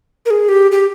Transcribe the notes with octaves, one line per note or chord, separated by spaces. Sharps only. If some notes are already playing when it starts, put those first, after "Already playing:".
A#4
G#4
G4
G4